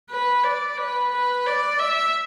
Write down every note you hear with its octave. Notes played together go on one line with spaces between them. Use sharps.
B4
D5
B4
B4
D5
E5